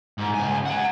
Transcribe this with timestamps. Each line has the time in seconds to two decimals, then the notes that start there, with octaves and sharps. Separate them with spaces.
0.18 G#2
0.34 C#2 G#5
0.66 F#5 G#5